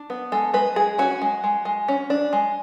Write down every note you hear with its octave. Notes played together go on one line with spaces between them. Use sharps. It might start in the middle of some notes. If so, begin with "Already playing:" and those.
Already playing: D4
B3
G#3 A4
G#3 B4
G#3 G#4
C#4 F#4
G#3
G#3
G#3
C#4
D4
G#3